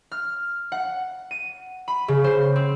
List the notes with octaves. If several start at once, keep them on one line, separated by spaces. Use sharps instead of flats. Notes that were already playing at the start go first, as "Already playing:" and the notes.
F6
F#5
D#7
B5
C#3
C5
C4